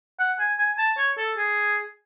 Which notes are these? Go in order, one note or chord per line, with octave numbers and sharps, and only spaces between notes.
F#5
G#5
G#5
A5
C#5
A4
G#4